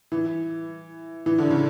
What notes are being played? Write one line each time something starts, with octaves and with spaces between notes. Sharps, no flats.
E3
E3
D3
C#3